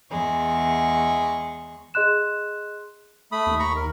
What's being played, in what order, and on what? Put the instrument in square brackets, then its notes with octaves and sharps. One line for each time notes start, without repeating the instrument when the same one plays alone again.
[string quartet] E2 G#3 C#6
[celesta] G#4 D#5 C6 F#6 E7
[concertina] A3 B5 D#6
[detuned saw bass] D#2
[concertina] A#5 B5 C#6
A#4